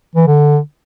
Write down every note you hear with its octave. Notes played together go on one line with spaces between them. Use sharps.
E3
D3